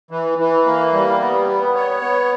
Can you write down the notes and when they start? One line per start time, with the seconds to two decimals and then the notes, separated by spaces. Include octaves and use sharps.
0.11 E3
0.38 E3
0.66 A#3
0.93 G3
1.20 B3
1.48 B3
1.75 C#5
2.02 B3